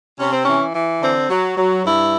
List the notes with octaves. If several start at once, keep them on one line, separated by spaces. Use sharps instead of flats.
C3 C#4
C4
E3 C#4
E3
D3 C4
F#3
F#3
G2 E4